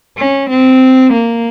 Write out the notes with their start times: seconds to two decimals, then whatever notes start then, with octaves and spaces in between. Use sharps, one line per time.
0.18 C#4
0.50 C4
1.13 A#3